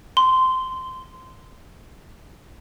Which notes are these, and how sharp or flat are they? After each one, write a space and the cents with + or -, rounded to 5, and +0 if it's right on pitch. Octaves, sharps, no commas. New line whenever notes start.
C6 -15